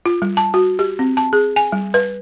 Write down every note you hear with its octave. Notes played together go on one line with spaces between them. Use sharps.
F4
G3
A5
F#4
G4
C4
A5
G#4
G#5
G3
B4